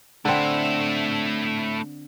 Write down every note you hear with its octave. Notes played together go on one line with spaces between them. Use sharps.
D3 A3 C4 E4